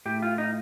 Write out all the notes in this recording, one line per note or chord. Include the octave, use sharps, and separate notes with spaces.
A2 G4
F4
D#4